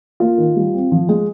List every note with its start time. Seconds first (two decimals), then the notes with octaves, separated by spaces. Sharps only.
0.20 A#3 F4
0.38 D#3
0.56 G3
0.74 C4
0.92 F3
1.09 G#3